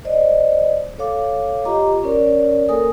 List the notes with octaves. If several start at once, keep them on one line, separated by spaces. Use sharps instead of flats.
C5 D5 D#5
A4 C#5 F5 D6
F4 G4 D#5 A#5 D6
C#4 A#4 C#5 D5
A#3 A4 A#4 G#5 D#6